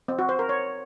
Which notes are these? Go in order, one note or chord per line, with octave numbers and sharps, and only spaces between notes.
C4
F#4
C5
A#4
C#5